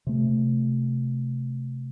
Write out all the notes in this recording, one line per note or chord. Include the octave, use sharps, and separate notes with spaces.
C3 A3